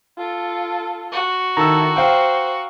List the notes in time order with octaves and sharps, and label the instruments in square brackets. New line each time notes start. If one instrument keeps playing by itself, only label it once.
[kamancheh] F4 A4
[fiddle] F#4
[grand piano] D#3 [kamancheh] E4 A4 [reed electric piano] A#5 E6
[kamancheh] C5 [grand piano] F5 G5